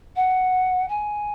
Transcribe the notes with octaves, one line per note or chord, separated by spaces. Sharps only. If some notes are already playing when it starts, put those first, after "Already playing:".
F#5
G#5